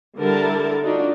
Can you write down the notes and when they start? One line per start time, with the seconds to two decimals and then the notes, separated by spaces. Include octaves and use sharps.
0.19 D3 G3 E4 A4 A#4 A5
0.84 D4 D#4 F4 F#4